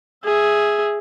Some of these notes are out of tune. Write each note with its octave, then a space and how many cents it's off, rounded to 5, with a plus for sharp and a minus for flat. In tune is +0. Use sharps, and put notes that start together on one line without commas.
G#4 +0 E5 +0